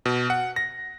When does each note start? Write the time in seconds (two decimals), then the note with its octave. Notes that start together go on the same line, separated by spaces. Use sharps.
0.05 B2
0.30 F#5
0.56 A#6